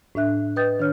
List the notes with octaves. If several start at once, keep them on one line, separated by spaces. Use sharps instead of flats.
A2 D4 E5 F#6
B4 D#5 G5 D#6 G6 A6
D#3 D4 C#5 F6